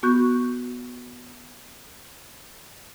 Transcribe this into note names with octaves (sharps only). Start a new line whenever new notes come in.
B3 F#4 C#6 F#6 G6